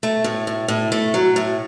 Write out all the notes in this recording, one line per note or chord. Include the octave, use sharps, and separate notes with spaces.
A3
A2
A2
A2
A3
F#3
A2